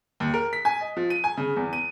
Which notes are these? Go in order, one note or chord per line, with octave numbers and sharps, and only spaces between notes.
D#2
A#4
B6
G#5
D#5
F3
D#7
G#5
C#3
E2
D#7